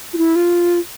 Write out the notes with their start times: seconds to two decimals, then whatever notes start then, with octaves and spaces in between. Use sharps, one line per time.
0.13 F4
0.18 E4
0.36 F4